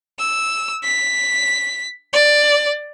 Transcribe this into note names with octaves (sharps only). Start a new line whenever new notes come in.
E6
B6
D5